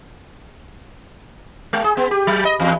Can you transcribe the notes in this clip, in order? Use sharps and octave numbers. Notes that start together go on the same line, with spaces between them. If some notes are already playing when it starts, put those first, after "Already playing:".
G#3
G#4
B3
G4
F#3
D#5
E2